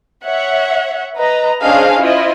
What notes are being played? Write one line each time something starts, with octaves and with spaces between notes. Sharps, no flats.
C#5 E5 F#5
B4 D#5 A#5
C#4 D4 G#4 C5 D#5 F5
E4 F4 C5 D#5